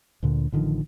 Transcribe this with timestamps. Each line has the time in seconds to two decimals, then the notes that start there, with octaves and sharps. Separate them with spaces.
0.23 D2 A#2 D3
0.52 A1 D3 D#3 F3